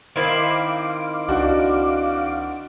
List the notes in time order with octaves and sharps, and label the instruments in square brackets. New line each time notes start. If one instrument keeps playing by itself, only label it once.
[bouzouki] D#3 C4 E4 [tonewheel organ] F5 D6
[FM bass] C#2 [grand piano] D4 D#4 F#4